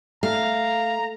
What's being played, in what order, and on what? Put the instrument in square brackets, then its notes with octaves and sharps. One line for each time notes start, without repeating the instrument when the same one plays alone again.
[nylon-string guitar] A3 [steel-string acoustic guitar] F5 [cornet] A#5